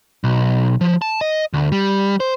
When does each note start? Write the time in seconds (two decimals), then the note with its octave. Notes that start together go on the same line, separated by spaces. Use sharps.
0.24 B1
0.81 F3
1.02 A5
1.21 D#5
1.53 D2
1.72 G3
2.20 C5